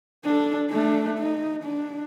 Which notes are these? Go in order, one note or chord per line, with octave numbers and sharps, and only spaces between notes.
D4 A4
A3 D4
D#4
D4